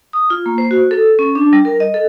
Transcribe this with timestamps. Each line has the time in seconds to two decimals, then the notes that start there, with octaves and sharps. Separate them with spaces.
0.13 D#6
0.30 F4
0.46 A#3
0.58 C5
0.71 F#4
0.91 A4
1.19 C#4
1.35 D4
1.53 G3
1.65 A#4
1.80 D#5
1.94 A4